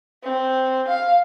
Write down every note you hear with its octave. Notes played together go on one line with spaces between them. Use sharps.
C4
F5